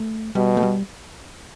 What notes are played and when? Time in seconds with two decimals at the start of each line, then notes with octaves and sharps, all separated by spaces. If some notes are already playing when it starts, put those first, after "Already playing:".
Already playing: A3
0.35 B2 G3
0.57 A3
0.63 G3